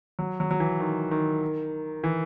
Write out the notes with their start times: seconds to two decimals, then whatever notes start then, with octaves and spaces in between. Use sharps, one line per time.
0.19 F#3
0.40 F#3
0.51 F#3
0.60 E3
0.80 D#3
1.11 D#3
2.04 E3